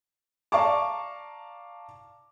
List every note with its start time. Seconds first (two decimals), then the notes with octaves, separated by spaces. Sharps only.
0.52 D5 F5 A5 A#5 C#6 D6